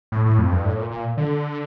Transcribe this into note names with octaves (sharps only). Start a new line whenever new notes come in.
A2
A2
F2
G2
A2
A#2
A#2
D3